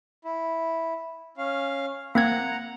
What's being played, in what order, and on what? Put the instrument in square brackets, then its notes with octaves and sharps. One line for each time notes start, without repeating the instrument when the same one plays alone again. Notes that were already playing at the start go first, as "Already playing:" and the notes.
[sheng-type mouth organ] E4
C#4 F5
[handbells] A#3 C4 G#6 [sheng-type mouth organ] F#5 A#5